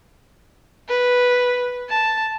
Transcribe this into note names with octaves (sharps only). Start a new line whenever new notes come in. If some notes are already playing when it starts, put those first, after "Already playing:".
B4
A5